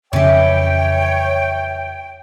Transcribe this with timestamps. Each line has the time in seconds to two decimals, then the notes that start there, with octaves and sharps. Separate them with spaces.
0.13 F2 C#3 E3 C#4 G4 C#5 G5